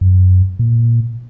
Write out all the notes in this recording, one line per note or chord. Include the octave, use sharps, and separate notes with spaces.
F#2
A#2